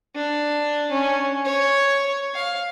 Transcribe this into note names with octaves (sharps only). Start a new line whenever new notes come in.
D4
C#4
C#5
F5